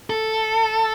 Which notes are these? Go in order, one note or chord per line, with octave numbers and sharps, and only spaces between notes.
A4